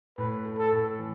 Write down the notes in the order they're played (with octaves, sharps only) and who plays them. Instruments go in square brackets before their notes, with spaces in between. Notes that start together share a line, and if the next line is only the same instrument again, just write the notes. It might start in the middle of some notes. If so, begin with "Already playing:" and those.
[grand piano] A2 [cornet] B4
[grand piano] A3
[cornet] A4
[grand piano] A2
E3